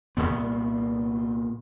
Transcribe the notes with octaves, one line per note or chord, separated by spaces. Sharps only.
C2 G2 A#2 B3